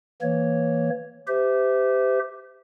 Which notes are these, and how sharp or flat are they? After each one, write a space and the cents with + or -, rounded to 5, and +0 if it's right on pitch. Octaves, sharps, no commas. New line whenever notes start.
E3 +0 A#3 +0 C#5 +0
G4 +0 C5 -35 E5 -15